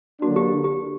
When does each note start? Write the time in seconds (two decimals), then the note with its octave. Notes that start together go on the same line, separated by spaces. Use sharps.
0.22 D3 F#3 A#3 D4 F#4
0.36 G4
0.64 G4